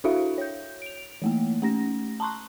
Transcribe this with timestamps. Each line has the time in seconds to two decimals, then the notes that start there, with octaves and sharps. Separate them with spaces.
0.04 D4 E4 F#4 A4 E5 F5
0.38 C#5 G6
0.82 D7 F7
1.22 E3 A3 A#3
1.62 A3 C#4 A#6
2.20 A5 A#5 C6 C#6 F#6